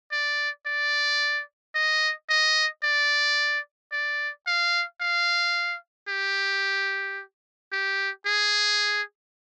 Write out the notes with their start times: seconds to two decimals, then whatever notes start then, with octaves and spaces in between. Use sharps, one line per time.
0.12 D5
0.66 D5
1.75 D#5
2.29 D#5
2.84 D5
3.92 D5
4.47 F5
5.01 F5
6.09 G4
7.72 G4
8.26 G#4